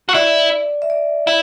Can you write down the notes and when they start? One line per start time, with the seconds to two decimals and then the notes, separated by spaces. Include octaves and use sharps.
0.09 F#4
0.14 E4 D5
0.82 E5
0.90 D5
1.27 E4